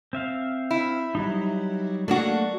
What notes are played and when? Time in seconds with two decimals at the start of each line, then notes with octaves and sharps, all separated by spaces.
0.13 C4 E5 F5
0.71 E4
1.15 F#3 G3 D#4
2.08 F#3 A3 A#3 D4 F#4